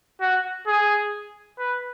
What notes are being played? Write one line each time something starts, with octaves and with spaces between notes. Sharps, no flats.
F#4
G#4
B4